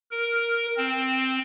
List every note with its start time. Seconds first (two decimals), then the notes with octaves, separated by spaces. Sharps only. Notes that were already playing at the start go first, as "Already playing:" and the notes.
0.11 A#4
0.77 C4